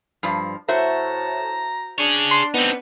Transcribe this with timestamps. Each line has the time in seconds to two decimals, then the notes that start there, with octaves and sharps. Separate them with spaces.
0.23 G2 F3
0.69 A2 F#4 C5 E5 A5 A#5
1.98 D4 G#4 C#5
2.31 C6
2.54 B3 C4 D#4